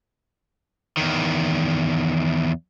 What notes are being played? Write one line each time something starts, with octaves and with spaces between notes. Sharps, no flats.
E2 D#3